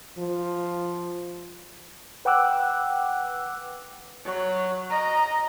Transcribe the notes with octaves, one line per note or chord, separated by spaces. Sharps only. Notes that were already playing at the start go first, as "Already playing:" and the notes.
F3
B4 F#5 G5 D6 E6 F#6
F#3
D#5 A#5